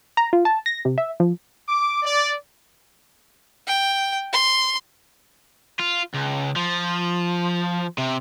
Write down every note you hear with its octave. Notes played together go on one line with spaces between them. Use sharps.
A#5
F4
A5
A#6
C3
E5
F3
D6
D5
G5
C6
F4
C#2
F3
C3